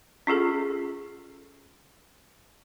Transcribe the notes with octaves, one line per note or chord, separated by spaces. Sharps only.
C#4 F4 G#4 A4